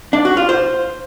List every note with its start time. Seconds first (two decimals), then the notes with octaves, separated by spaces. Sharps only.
0.13 D4
0.25 F#4
0.37 F4
0.49 C5